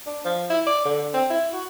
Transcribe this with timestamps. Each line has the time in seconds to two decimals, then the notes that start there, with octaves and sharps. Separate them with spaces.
0.06 D4
0.25 F3
0.50 E4
0.67 D5
0.85 D3
1.14 C4
1.30 E4
1.53 F#4